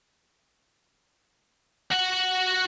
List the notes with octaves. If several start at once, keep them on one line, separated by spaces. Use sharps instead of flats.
F#4 F#5